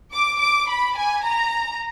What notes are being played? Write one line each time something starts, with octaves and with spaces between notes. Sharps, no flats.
D6
D6
B5
G#5
A#5